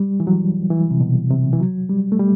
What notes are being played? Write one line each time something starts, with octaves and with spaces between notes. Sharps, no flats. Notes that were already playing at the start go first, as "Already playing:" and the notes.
Already playing: G3
E3
F#3
E3
C3
B2
C3
E3
F#3
G3
A3
G3